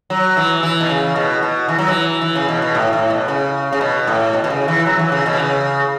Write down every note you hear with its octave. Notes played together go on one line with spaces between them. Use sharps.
F#3
E3
E3
B2
C#3
B2
B2
E3
F#3
E3
E3
C#3
B2
B2
A2
A2
B2
C#3
C#3
B2
A2
B2
B2
C#3
E3
F#3
E3
C#3
B2
E3
C#3